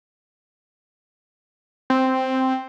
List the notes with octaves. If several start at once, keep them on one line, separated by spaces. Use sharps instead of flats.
C4